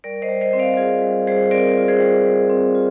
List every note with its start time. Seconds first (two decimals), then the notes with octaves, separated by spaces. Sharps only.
0.04 G3 A#4 D5
0.22 C5 D#5
0.29 G3
0.41 C5 D#5
0.53 C4
0.59 D5 F5
0.77 F4 G#4
1.02 G3
1.27 G3 G#4 C5
1.51 C4 A#4 D5
1.77 F4
1.88 G#4 C5
2.00 G3
2.26 G3
2.49 C4
2.75 F4